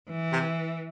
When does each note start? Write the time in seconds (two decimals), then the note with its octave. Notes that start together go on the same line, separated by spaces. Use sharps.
0.10 E3
0.32 C3